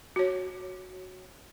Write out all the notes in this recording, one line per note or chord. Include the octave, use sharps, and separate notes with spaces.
F#4 C#5